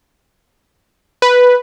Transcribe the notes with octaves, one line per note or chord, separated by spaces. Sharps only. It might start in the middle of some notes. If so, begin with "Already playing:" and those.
B4